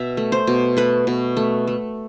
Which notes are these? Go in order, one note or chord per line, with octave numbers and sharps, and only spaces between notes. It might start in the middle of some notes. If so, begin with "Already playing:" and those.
Already playing: B2 E5
A3
C5
B2
A3 B4
B2
A3
A3